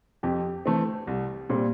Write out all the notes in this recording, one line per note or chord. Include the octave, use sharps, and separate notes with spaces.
F2 G4
E3 A3 C4
C2
A#2 G3 C4